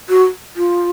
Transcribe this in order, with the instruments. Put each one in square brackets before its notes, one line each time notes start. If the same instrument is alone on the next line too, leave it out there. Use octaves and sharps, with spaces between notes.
[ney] F#4
F4